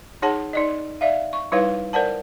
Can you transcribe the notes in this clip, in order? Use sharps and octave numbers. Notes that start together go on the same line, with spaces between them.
D#4 G#4 C#5 F#5 A5
D#4 D5 D#5
D5 E5 F5
C#6
G3 D#4 E4 B4 C#5 F5
A#4 C5 D5 F#5 A5